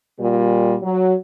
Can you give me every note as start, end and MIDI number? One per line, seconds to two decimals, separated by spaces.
0.20 0.74 46
0.20 0.74 55
0.82 1.13 54